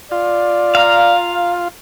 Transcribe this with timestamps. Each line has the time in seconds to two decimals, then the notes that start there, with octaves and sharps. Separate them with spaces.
0.11 F4 D5
0.75 F5 A#5